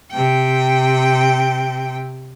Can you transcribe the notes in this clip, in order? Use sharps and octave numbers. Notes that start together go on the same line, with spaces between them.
C3 G5